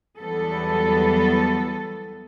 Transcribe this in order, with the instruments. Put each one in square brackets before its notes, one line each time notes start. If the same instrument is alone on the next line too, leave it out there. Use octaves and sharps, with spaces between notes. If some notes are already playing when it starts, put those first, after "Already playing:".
[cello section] E2 F#3 G3 B3 A4